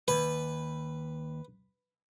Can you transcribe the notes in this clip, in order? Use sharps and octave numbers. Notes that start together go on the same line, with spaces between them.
D#2 B4